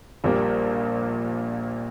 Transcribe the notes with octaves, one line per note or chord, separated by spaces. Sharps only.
A#1 A#2 G3 A#3